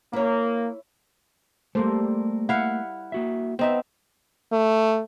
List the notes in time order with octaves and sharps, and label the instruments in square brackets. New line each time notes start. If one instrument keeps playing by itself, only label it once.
[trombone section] A#3 [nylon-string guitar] E4 C#5
[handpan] G3 A4 C5 [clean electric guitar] A3 A#3 A#4
[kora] E4 F5 [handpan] F#5
[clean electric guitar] A#3 F#4 E5
[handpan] B3 [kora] C4 D#4 E5
[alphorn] A3